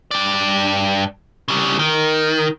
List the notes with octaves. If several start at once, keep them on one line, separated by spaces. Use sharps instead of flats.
G2 D5
C#3 G3
D#3